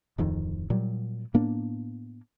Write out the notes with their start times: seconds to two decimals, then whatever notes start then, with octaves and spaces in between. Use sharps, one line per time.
0.18 D1 F2 D#3
0.70 A#2 F#3 G3
1.34 A2 A#3 B3 D4